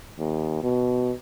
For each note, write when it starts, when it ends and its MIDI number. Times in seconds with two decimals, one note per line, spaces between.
0.19 0.61 39
0.63 1.13 47